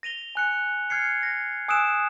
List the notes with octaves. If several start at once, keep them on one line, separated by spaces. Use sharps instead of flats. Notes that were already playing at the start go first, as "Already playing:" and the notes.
A#6 D#7 F7 G7
G#5 F#6 C#7
F6 G#6 C7 C#7
A#6
G#5 D#6 E6 F#6 D7 E7